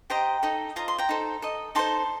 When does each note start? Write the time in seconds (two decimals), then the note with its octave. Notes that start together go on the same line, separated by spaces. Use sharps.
0.10 G4 C5 D#5 G5 A#5
0.43 D#4 A4 D#5
0.76 F4 C5 D#5 A#5
0.88 C6
0.98 G5 A#5
1.09 D#4 A4 C5
1.42 A4 D#5
1.75 D#4 A4 C5 A5 C6